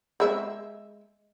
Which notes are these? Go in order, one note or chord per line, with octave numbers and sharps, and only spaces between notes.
G#3 E5